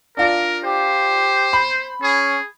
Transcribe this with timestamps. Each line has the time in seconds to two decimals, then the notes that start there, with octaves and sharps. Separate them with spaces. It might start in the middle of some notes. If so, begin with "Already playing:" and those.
0.17 D4 F4 A#4 D5
0.64 G4 C5
1.53 B5
2.02 C#4 G#4